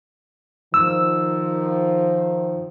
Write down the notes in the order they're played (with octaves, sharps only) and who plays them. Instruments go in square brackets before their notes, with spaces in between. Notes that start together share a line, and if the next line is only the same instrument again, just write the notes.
[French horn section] D#3 F3 [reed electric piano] E6